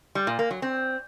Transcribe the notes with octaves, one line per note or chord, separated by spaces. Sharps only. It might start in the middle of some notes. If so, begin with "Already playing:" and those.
G3
A#2
A#3
F#3
C4